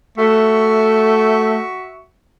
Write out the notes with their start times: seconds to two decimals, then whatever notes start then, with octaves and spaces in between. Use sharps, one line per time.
0.18 A3 F#4 E5 C#6